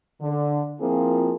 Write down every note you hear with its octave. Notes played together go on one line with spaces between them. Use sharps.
D3
F3 A#3 C4 E4 F4 G#4